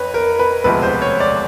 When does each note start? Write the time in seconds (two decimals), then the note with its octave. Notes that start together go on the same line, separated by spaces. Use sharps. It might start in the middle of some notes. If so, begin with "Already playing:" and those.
Already playing: F2 B4 C#5
0.14 A#4
0.39 B4
0.64 E1 D2 C3 F3 G#3 B4
0.83 C5
1.02 C#5
1.20 D5